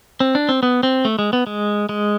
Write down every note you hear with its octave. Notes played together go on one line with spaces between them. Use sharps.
C4
D4
C4
B3
C4
A3
G#3
B3
G#3
G#3